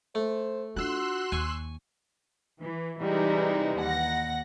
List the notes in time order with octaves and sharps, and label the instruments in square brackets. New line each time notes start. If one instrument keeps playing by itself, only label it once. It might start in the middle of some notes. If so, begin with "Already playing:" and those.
[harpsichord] A3 [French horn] C5
[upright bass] D4 F4 [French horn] F#4 [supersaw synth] C6 E6 F#6
[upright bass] D#2 [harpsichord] G#5 C#6
[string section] E3
C3 E3 G3 G#3 D#4
D#2 F#5 A#6